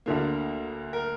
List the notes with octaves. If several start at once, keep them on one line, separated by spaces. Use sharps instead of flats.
D2 D3 A#3
A#4